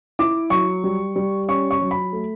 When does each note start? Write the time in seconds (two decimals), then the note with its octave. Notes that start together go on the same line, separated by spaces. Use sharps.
0.19 E4 D6
0.50 F#3 C#6
0.84 G3
1.16 G3
1.48 C#4 C#6
1.71 C#6
1.81 F#3
1.91 B5
2.13 A3